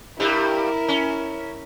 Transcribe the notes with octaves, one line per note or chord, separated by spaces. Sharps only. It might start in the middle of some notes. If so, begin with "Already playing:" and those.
G2 G3 E4 A#4
C#4